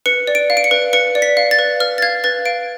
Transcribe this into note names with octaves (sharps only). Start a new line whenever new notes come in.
B4 C#7
D5
D7
F5
D7
C#7
B4
B4 C#7
D5
B6
F5
A6
B4
B4 F6
A6
F5 G#6
B4 A6
F5 D7